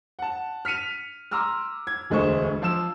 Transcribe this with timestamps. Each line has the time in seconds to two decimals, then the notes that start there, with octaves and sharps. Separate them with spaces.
0.19 F#5 A5
0.65 F6 B6 C#7 D#7 F7
1.31 A#5 C6 D6 E6 F6
1.87 G#6
2.10 E1 D2 G#3 A3 C5 C#6
2.62 F3 F4 A5 E6 E7